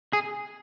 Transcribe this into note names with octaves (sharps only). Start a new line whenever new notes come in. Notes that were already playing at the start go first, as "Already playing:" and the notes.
G#4